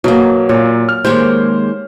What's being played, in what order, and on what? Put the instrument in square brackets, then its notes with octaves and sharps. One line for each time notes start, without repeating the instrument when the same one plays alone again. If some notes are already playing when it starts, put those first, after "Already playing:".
[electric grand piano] B2 [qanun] F#3 A#3
[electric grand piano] A#2 [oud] C#5
[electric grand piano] F6
[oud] D#3 G#3 A#3 [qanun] G4 C#5 [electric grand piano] C5